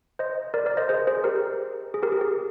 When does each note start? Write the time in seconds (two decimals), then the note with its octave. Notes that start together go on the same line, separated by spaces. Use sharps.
0.19 C5 D#5
0.54 A#4 D5
0.66 A#4 D5
0.77 C5 D#5
0.89 G#4 C5
1.07 G#4 C5
1.24 G4 A#4
1.94 G#4
2.03 G4 A#4
2.12 G#4
2.21 G4